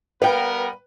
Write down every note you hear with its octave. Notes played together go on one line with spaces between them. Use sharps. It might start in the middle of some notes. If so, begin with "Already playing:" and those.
G3 B3 A#4 B4 F5 G5